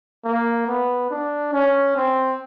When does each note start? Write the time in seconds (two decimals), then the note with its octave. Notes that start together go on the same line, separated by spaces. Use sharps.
0.25 A#3
0.67 B3
1.10 D4
1.53 C#4
1.96 C4